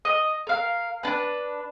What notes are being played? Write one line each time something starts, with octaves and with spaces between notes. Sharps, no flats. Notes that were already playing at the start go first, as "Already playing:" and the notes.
D#5
A#4 F5
D4 B4